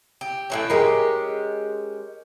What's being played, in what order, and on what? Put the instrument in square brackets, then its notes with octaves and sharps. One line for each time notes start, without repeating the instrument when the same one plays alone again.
[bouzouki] G4
A2 E3 C#4
[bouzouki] G#3 C#4 G4 [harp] A#4 B6 C#7